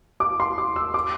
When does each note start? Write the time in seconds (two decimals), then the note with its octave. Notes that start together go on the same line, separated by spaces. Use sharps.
0.20 D6
0.40 C6
0.58 D6
0.76 E6
0.94 D6